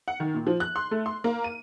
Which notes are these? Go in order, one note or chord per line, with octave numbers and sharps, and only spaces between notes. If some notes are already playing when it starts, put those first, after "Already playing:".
F#5
D#3
A#2
F3
F#6
C6
A3
C6
A#3
D#7